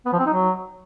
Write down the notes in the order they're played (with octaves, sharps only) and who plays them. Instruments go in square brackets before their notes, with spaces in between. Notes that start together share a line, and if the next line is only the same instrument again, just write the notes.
[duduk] B3
F3
C4
D#4
F#3